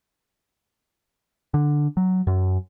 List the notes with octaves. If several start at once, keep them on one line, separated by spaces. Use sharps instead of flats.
D3
F#3
F#2